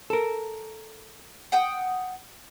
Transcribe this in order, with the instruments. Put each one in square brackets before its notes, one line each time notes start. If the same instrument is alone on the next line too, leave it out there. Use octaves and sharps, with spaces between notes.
[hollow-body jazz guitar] A4 A#4
[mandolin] F#5 G5 D#6